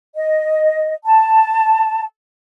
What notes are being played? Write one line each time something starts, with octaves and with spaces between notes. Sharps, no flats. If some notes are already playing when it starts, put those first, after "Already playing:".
D#5
A5